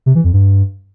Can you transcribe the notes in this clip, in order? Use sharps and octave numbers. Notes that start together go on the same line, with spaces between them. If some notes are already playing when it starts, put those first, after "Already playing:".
C3
E3
F2
G2